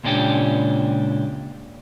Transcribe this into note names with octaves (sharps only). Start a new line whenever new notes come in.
C#2 A#2 C#4 D4 G4